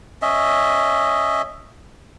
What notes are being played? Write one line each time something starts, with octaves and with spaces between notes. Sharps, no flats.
C#4 D#5 E5